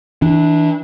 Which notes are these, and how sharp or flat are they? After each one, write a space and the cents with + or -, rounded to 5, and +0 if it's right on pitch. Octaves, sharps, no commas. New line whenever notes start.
E3 -25 D4 +0